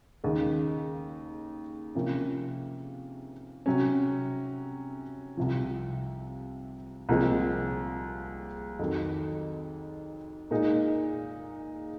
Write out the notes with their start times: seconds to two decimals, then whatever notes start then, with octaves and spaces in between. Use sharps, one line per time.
0.24 D#2 C#3 G#3
1.95 C3 F3 A#3 C#4
3.66 C3 F#3 C#4
5.37 C2 C3 F3
7.09 C2 A#2 F3 G#3 C4
8.79 F2 D#3 F#3
10.51 A#2 G#3 D#4